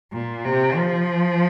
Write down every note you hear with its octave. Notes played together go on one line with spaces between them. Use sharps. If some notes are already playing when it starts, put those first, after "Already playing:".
A#2
C3
F3